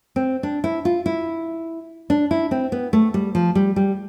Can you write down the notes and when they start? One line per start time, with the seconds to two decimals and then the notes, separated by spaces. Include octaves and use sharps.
0.16 C4
0.43 D4
0.64 E4
0.85 F4
1.06 E4
2.10 D4
2.31 E4
2.51 C4
2.72 B3
2.93 A3
3.14 G3
3.35 F3
3.55 G3
3.76 G3